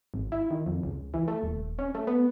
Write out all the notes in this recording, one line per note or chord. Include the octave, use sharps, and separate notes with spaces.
G#1
E4
D#3
F2
C#2
E3
A3
D#1
C#4
A3
B3